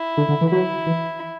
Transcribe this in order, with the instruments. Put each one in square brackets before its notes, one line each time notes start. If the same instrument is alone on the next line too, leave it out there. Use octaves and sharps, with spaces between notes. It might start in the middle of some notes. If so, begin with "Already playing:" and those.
Already playing: [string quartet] E4
[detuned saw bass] D3
D3
E3
[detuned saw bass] F#3 [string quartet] E4
[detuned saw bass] E3